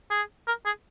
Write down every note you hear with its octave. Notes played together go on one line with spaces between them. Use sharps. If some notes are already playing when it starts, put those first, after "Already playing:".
G#4
A#4
G#4